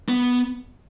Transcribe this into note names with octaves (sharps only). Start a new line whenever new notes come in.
B3